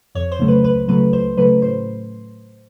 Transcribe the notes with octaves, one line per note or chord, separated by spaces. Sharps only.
F2 C#5
C5
C#3 F#3 A3
B4
C#2 B4
C#3 F#3 A3 B4
C#2 C5
C#3 F#3 A3 B4
A2 C5